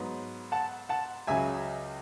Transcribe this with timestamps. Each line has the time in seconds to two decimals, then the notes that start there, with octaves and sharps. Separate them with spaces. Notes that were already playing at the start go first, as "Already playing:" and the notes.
Already playing: G#2 F#3 B3
0.52 F#5 A5
0.89 F#5 A5
1.27 C#2 C#3 F#3 E5 G#5